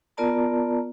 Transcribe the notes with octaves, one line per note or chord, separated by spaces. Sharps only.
B3 F4 A#4 D5 A5 A#5